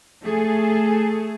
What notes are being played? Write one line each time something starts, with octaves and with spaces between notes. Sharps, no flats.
A3 G#4 A4